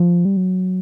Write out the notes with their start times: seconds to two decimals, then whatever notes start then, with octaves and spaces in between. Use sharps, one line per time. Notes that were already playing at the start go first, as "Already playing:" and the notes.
Already playing: F3
0.25 G3
0.37 F#3